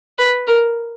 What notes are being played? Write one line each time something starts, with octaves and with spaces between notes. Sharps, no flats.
B4
A#4